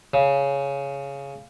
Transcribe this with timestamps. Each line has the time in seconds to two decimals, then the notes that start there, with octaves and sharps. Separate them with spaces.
0.14 C#3